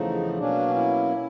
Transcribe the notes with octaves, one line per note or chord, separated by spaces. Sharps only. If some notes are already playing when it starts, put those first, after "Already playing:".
Already playing: E2 C#3 F3 A3 D#4
B2 F#3 A#3 C#4 D4
E4